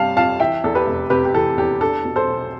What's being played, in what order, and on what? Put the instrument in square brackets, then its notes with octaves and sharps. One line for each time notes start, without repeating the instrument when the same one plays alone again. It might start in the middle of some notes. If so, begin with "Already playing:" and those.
Already playing: [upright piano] G1 C3 G3 F5 A5
F2 F5 A5
E3 E5 G5
E2 A4
G4 B4
F1
C3 G4 B4
G4
E3 A4
E2 G4
D4 A4
B2
A4 C5
B1